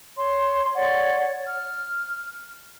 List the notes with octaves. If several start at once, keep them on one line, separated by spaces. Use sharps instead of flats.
C#5 C6
C#5 D5 F#5
F6